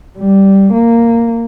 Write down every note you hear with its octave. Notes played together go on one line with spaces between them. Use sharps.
G3
A#3